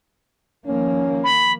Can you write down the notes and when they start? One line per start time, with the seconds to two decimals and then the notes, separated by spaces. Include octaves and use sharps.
0.66 D#3 F3 A#3 C#4
1.24 B5